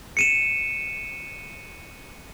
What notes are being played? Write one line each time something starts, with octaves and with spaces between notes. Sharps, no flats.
C#7 D#7 E7